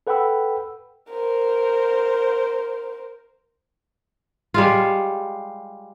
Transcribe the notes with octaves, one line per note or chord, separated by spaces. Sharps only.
A4 B4 F#5 G5 B5 E6
A#4 C5
G3 G#3 F4